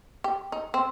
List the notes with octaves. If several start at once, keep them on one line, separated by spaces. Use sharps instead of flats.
G4
D#4
C4